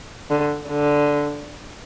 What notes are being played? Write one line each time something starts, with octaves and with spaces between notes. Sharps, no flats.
D3
D3